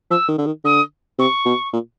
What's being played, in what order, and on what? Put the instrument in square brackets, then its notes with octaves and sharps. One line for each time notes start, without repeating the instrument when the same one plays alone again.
[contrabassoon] F3 [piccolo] E6
[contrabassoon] D#3
D3
D#3
[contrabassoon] D3 [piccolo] D#6
[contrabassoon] C3 [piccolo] C#6
[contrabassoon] B2
A#2